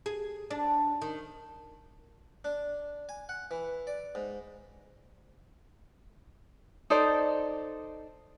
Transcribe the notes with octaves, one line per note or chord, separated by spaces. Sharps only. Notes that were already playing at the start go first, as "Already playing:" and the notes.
G#4
D4
D#3
D4
G#5
F#5
E3
D5
G#2
D#4 A4 C5 D5